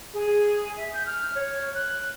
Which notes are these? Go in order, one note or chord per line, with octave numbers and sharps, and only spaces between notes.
G#4
E5
G6
F6
C#5
F#6